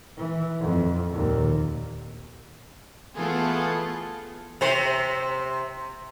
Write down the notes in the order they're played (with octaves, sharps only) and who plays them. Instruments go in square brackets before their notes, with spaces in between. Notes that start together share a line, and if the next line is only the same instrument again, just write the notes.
[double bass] E3
F2
D#2 A#2
[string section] E3 A3 B3 F4 G#4 A4
[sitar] C3 C5